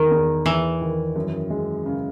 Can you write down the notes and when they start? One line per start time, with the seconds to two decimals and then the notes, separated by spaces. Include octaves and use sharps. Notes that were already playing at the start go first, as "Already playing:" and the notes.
Already playing: E2 D#3
0.11 E2
0.45 E2 E3
0.81 D#3
1.16 F#2
1.50 G#3
1.86 C#3